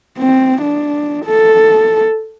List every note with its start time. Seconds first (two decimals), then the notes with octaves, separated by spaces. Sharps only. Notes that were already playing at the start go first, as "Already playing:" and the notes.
0.18 C4
0.62 D4
1.26 A4